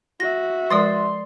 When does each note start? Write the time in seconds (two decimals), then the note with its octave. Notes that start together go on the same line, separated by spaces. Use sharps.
0.20 F#4 E5 A#6
0.70 F3 G#3 A#4 D5 C6 D#6 A6